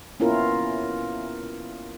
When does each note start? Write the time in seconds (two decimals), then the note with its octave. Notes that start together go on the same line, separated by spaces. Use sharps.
0.20 A#3 B3 C#4 E4 F4 A#4